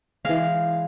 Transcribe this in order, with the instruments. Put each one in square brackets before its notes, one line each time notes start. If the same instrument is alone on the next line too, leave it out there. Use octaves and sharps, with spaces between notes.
[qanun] E3 G#3 F5